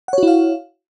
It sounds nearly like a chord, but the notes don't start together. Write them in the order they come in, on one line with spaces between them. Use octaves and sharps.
F#5 C#5 F#4 E4 F5